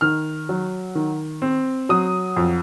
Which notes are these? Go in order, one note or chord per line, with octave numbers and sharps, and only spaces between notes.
D#3 F6
F#3
D#3
C4
F#3 D#6
F2